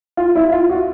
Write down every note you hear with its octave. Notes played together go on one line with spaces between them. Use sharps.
F4
E4
F4
F#4